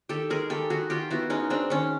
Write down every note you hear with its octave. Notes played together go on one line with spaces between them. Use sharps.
D#3 G4 A4
G#3 G#4 A#4
D#3 G4 A4
D#3 F#4 G#4
D#3 F4 G4
B3 E4 F#4
G#3 C#4 D#4
G#3 C4 D4
D#3 C#4